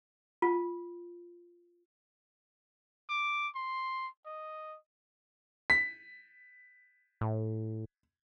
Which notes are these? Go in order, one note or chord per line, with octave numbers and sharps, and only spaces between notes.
F4
D6
C6
D#5
B6
A2